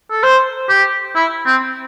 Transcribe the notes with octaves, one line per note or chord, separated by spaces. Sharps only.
A4
C5
G4
E4
C4